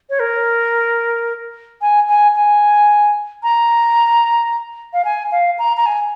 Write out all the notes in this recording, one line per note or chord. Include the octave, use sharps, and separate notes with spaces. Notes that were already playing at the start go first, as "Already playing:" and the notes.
C#5
A#4
G#5
G#5
G#5
A#5
F5
G#5
F5
A#5
A#5
G#5